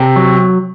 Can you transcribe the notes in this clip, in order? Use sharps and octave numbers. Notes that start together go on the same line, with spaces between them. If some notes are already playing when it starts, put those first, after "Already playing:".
Already playing: C3 G4
F#3